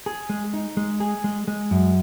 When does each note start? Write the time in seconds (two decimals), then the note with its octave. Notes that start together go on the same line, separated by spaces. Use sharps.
0.06 G#4
0.29 G#3
0.53 D#4
0.77 G#3
1.00 G#4
1.24 G#3
1.48 G#3
1.71 F#2